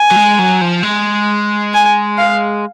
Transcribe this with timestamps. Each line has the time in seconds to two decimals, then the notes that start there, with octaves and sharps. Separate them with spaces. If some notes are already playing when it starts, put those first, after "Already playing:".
Already playing: G#5
0.11 F#3
0.16 G#3
0.39 F#3
0.61 F3
0.83 G#3
1.74 G#5
2.18 F5